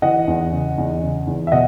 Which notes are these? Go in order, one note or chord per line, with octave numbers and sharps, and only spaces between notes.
E3 D#5 F#5
E2
C#3
E2
C#3
E2
E5
B2 D#5 F#5